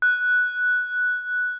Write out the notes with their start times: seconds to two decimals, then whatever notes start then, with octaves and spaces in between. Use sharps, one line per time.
0.02 F#6